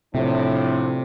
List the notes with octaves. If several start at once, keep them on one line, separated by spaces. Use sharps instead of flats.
A2 C3 F3 D4